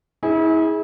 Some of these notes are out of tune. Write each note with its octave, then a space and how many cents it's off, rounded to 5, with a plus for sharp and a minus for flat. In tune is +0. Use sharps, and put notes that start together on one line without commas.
E4 -35 G#4 +0